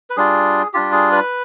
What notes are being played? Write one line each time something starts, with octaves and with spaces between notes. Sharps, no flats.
B4
G3 D4 F4 G#4
G3 D4 F4 G4
G#4
B4